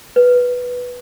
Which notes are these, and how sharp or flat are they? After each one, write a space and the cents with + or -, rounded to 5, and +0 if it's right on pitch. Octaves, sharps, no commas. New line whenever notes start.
B4 -5